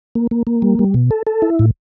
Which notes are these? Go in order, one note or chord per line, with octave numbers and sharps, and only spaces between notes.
A#3
A#3
A#3
G3
G3
B2
A4
A4
E4
A2